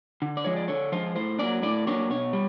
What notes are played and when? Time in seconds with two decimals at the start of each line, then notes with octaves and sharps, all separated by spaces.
0.22 D3
0.37 D5
0.45 F3 G#3 C#5
0.57 D5
0.68 D3 C#5
0.92 F3 G#3 C5
1.16 A2 C5
1.39 F#3 A#3 D4 D5
1.63 A2 D5
1.87 F#3 A#3 D4 C#5
2.10 B2 C#5
2.33 G3